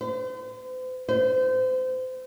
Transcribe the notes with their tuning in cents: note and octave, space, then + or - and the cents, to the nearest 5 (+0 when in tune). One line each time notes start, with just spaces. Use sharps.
C5 -40
C5 -30